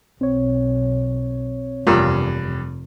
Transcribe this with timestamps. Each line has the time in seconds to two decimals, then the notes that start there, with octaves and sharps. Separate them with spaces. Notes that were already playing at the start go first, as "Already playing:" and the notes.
0.21 B1 C4 C#5
1.87 F1 E2 G2 F4 A#4 E6